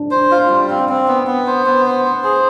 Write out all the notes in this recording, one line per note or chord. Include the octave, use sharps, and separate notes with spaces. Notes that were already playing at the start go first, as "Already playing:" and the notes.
Already playing: D4
C5
F4
G3
C4
C4
B3
B3
C5
B3
C5
C5
G#4